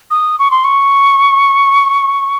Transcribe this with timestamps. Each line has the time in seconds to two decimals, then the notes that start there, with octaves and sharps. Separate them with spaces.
0.11 D#6
0.39 C#6
0.51 C6
0.64 C#6